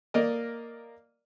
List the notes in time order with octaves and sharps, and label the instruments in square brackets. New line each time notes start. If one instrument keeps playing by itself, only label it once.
[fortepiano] A#3 A#4 D5 D#5